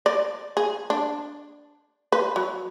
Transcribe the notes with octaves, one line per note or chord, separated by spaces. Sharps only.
D5
G#4
D4
B4
F#3